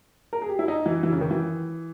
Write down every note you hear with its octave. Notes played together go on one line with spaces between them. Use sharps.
A#4
G#4
G4
E4
D#4
E3
E3
C#3
D#3
E3